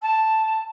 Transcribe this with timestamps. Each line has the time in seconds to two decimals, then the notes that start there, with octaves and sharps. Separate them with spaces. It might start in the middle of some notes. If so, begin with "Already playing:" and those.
0.02 A5